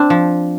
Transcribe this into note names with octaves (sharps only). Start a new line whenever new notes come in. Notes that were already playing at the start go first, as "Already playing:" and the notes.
Already playing: C4 D4
F3